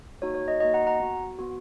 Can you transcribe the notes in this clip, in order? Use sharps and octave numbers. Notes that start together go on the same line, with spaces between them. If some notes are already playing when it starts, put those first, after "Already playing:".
A#3 D#4 F#4 C#5
C#5
D#5
A#3 D#4 F#4 D#5
F#5 A#5
F#5 A#5
B3 F#4
B3 F#4